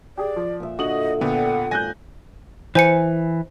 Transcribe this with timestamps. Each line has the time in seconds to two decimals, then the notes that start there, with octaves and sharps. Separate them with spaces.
0.17 G4 G#4 D5
0.36 F3
0.60 A#2 E5
0.79 D3 F#4 D#5 D6 D#6 F#7
1.21 A#2 D3 B3 F#5 G5
1.71 G#1 G#5 F#6 G6 A#6
2.75 E3 C5 G#5 C#7